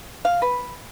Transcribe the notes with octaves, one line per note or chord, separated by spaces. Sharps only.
F5
B4